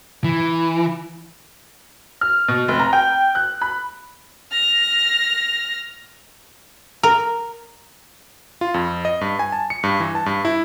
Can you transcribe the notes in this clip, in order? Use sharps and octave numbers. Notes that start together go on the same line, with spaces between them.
E3
F6
B2
F1
A#5
G5
F#6
B5
F6 A#6
A#4
F4
F2
D#5
G2
G#5
A5
C#7
G2
E3
A5
G2
E4